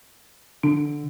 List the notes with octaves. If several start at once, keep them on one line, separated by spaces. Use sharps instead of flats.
D3 D4